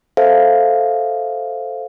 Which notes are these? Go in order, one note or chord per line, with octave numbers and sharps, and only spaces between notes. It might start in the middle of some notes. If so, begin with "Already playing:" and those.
A4 C5 E5 F5